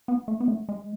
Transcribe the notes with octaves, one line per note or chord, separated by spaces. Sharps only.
B3
A3
B3
A3
G#3